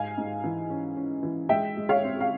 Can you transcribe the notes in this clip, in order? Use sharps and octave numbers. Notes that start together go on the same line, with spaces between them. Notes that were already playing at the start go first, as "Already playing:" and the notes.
Already playing: G#2 F5 G#5
G#2
E3
C#4
C#4
E3
G#3 E5 G5
G#3
C#5 F5
C4
F5